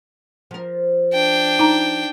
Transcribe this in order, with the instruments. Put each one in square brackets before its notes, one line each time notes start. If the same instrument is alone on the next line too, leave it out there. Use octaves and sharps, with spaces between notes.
[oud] F3 A#4
[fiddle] D4 G5
[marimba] D#4 A#5